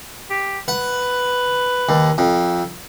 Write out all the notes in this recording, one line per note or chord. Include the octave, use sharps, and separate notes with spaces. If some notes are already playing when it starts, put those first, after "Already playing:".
G4
B4 F#5
D#2
F2